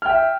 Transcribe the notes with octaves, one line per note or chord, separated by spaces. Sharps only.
E5 G5 F6